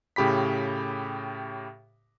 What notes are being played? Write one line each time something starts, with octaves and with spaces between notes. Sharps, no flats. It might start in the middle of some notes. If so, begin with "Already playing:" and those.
A2 C#3 G4 B5 B6